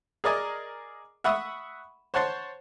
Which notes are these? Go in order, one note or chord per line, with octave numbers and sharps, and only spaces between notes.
G#4 A#4 D5 D#5 G#5
E5 F#5 B5 C#6 D#6
C5 C#5 F#5 A5 C6